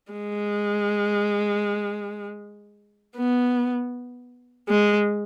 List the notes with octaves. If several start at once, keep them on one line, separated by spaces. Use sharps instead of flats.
G#3
B3
G#3